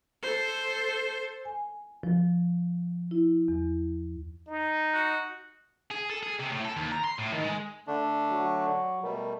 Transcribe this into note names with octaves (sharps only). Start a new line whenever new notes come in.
A4 C5
G#5
F3
E4
E2
D#4
F#4
G#4
A4
G#4
C3
A2
A4
D#2
A#5
C6
A2
D#3
G#3
D3 A3 D4
F#3
B2 G3 A3 A#4